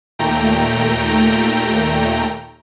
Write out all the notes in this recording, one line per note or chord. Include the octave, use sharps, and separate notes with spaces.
D#2 A#2 A3 G5 A#5